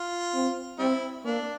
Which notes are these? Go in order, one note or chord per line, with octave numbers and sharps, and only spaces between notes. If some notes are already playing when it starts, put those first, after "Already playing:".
Already playing: F4
C4
G3 C4 E4
A#3 D4